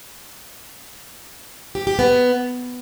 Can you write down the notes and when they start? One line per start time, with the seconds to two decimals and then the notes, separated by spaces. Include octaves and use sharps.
1.75 G4
1.87 G4
1.99 B3